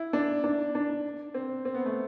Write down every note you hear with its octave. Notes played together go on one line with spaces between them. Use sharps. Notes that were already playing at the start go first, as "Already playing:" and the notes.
Already playing: E4
D4
D4
D4
C4
C4
B3
A3